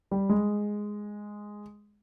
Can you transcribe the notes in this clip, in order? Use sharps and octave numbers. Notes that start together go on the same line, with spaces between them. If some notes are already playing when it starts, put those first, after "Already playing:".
G3
G#3